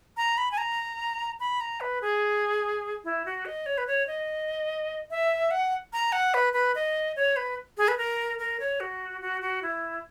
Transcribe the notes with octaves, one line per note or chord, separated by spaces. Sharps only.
A#5
B5
G#5
A#5
B5
A#5
B4
G#4
E4
F#4
D#5
C#5
B4
C#5
D#5
E5
F#5
A#5
F#5
B4
B4
D#5
C#5
B4
G#4
B4
A#4
A#4
C#5
F#4
F#4
F#4
E4